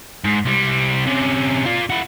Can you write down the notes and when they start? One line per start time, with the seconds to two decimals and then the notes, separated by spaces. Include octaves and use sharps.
0.25 G#2
0.46 C3 G3
1.07 C3 C#4
1.66 F4 D5
1.90 E4 F#4